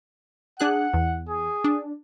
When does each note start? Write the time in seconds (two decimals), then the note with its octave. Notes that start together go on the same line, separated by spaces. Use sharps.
0.59 D4 G#4 F#5 F#6
0.94 E2
1.29 G#4
1.64 D4